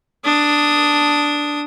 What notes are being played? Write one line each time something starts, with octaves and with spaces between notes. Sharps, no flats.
D4 D#6